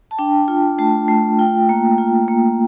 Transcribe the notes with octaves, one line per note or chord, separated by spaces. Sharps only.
A5
D4 G5
F4
A3 A5
A3
F4 G5
A#3
F4
A#3